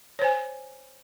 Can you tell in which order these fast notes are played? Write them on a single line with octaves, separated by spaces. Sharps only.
C#5 C5 G#5